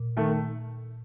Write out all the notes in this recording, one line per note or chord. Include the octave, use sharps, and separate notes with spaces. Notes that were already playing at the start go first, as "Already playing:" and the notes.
Already playing: A#2
D#3 A3